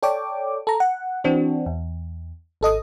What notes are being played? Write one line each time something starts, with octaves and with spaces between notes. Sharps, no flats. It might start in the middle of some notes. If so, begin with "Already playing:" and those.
A4 C#5 D5 G5 D6
A4 A#5
F#5
E3 C4 D4 F#4
E2
G#1 A4 D#5 D#6